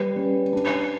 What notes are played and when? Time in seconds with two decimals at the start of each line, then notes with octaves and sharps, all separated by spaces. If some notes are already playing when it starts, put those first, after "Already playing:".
Already playing: G3 B4
0.16 C#4
0.53 D4